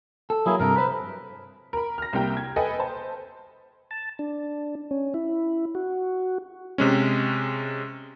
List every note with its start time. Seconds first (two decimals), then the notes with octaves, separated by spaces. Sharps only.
0.30 A4
0.46 F#3 A#3 E4 G#4
0.60 G2 C3 A4 A#4
0.76 B4 C5 B5
1.73 A#4 B5
1.98 F6 A#6
2.13 C2 C3 A#3 G5 A#5
2.37 G#6
2.56 A4 B4 D#5 G5 G#5
2.79 C5 A5
3.91 A5
4.19 D4
4.91 C#4
5.14 E4
5.75 F#4
6.78 C3 G#3 C#4